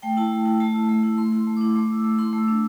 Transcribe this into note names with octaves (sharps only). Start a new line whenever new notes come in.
A3 G5
E4 A5
A3
E4
A3 A5
E4
A3
E4
A3 C6
E4 C6
A3
D6
E4
A3 D6
E4 E6
A3
E4 C6
A3 E6
D6
D4